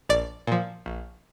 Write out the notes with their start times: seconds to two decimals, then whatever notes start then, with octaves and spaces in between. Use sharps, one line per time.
0.09 A#1 D5
0.47 A#2 F3
0.86 A#1